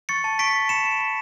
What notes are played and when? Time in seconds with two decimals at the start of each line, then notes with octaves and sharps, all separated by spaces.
0.09 C#6 A6 C#7
0.24 A5
0.39 C#6 B6 D7
0.55 A5
0.69 B5 C#7 E7
0.84 B5
1.00 B5